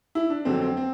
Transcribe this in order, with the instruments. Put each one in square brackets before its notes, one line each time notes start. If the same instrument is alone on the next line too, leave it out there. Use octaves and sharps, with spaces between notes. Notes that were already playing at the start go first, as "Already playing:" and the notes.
[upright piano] E4
D4
F2 D3 F#3 C4
C4
C4